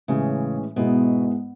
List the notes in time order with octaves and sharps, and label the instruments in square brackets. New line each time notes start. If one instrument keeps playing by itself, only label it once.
[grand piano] A2 E3 G#3 C#4 [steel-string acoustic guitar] C#3
[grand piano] G#2 G#3 B3 E4 [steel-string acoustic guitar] B2